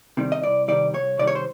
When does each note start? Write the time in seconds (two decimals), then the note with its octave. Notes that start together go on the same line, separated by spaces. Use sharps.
0.17 C3 D#3 G3
0.32 D#5
0.43 C2 D5
0.68 C3 D#3 G3 D5
0.94 C2 C#5
1.19 C3 D#3 G3 D5
1.27 C#5
1.35 C5